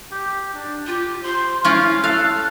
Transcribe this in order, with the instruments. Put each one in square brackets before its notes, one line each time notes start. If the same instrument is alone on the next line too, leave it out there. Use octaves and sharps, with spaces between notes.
[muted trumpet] G4
D4
[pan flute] F4 [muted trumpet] G4
[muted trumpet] C5 [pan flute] C6
[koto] C#4 F4 [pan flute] E4 [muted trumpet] F5
[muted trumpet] A4 [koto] F5 [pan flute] F#6